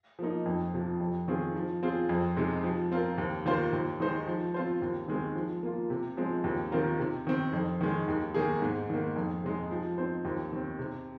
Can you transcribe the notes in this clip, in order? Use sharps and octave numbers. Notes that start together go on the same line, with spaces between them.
F3 A#3 D#4
F2
C3 F3
F2
D#3 C4 F4 G#4
F3
C4 F4 G#4
F2
C3 G#3 D#4
F3
C4 F4 A#4
D#2
D#3 A#3 F4 C5
D#2
D#3 G#3 D#4 C5
F3
C4 F4 C5
D#2
D#3 G#3 C4
F3
A#3 F4
C3
F3 G#3 C4
D#2
D#3 C4 F4 A#4
C3
D#3 C4
F2
D#3 G#3
D#2
D#3 A#3 G#4
G#2
D#3 A#3
F2
C3 G#3 D#4
F3
C4 D#4 C5
D#2
D#3 C4
C3